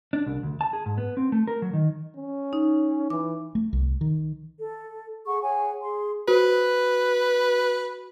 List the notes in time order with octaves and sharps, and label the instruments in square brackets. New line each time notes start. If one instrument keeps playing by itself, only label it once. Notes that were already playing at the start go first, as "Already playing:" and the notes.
[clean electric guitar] D4
C2
D2
A5
G#4
G#2
B3
C4
A3
A#4
F#3
D#3
[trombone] C#4
[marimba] D#4
[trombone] E3 [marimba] D6
[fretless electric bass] A3
C2
D#3
[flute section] A4
G#4 F#5 C#6
G#4 C#5 F#5 G#5
G#4 C6
[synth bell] F#4 [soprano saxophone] B4